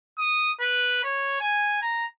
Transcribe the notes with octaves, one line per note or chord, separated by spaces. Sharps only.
D#6
B4
C#5
G#5
A#5